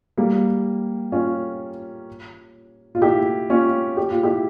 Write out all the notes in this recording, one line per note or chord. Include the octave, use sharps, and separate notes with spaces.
G3 A#3
C#4 F4
F4
E4 G4
C#4 F4
G4
F4
E4 G4